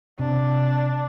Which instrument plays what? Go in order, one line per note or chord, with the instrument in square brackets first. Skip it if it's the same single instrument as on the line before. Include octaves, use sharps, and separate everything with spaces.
[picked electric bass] C3 [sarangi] D4